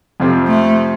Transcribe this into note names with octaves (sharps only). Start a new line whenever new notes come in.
F2 C3 F3 C4
A3